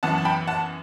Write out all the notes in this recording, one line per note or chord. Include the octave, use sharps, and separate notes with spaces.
F#2 E3 B3 F#5 A5
A5
G5 B5
F#5 A5